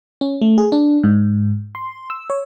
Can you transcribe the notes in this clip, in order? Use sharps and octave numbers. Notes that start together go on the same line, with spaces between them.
C#4
A3
G#4
D4
G#2
C6
E6
C#5